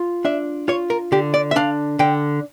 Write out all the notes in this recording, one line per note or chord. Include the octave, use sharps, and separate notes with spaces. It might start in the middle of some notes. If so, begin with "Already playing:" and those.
Already playing: F4
D4 E5
F4 C#5
A#4
D3 G4
D5
E5
D4 F5
D3 G5